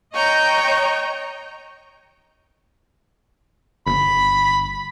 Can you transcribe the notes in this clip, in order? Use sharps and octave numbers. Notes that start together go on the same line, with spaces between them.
C#5 D#5 G5 A#5 C#6
G1 B5